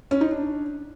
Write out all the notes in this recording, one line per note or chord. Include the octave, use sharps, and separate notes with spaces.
C#4
D#4
D4